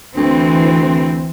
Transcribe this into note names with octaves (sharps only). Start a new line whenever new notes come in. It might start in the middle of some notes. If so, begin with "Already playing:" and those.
D2 E3 C4